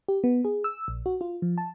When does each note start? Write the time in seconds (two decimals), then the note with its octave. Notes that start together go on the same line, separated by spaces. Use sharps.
0.08 G4
0.24 B3
0.45 G#4
0.64 E6
0.88 A#1
1.06 F#4
1.21 F4
1.42 F3
1.58 A5